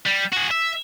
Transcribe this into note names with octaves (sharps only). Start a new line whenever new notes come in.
G3
F#4 G#4
E5